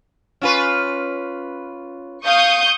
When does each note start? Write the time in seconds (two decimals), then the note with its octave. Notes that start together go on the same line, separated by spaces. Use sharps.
0.41 C#4 F4 B4
2.25 F5 C#6 D#6 G6